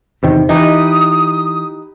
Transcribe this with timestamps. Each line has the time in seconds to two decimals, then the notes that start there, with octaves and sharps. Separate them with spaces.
0.23 E2 C3 D#3
0.49 E3 D#4 G4 B4 D#6